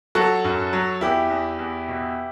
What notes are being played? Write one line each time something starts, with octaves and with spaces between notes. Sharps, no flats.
F#3 F#4 A4
F#2
F#3
E2 E4 G4
E2
E2
B2